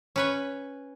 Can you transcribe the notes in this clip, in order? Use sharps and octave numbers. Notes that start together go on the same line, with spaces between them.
C#4 B4 C#5